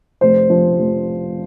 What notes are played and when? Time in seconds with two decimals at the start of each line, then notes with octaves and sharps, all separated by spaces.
0.21 F1 C5
0.50 F3
0.78 F1